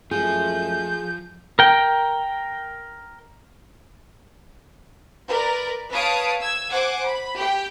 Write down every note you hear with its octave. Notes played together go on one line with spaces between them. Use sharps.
F#2 F3 G#3 A3 G#4 G6
A#4 G5
A#4 B4 D5
B4 C#5 F5 A5 D#6 D7
E6 G#6
C5 F#5 G#5 D6
B5
G4 G5